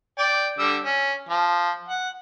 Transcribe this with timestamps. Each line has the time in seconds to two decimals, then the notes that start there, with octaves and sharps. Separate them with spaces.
0.18 D5 G5
0.59 D3 G3 E6
0.84 C#4
1.29 F3
1.88 F#5